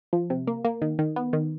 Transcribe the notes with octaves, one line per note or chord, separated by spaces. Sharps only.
F3
C3
A#3
A#3
D#3
D#3
B3
D#3